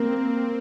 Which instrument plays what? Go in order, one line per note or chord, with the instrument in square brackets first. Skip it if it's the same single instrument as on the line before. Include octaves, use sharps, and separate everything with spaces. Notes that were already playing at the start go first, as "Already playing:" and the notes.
Already playing: [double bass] A#3 [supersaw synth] C4